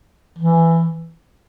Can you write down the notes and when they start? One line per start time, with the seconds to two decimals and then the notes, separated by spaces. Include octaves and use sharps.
0.38 E3